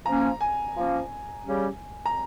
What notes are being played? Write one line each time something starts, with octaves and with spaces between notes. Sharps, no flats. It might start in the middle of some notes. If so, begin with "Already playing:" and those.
F3 A#3 C#4 A#5
G#5
F3 A#3 C#4
C#3 G3 C#4 G4
A#5